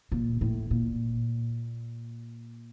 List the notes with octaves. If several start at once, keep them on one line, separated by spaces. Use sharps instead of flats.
A#2
A2
A#2